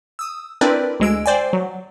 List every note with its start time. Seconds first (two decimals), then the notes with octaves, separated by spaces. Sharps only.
0.19 D#6 E6
0.61 C4 D4 E4 A#4 B4 D5
1.00 D2 G#3 E6 D7
1.26 C5 D5 G5 G#5
1.53 F#3